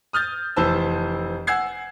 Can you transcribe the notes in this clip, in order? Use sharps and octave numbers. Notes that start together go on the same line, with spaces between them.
D#6 F6 G6 A6
F1 E3 C5 A5 E6
F#5 G#5 E6 G#6 C7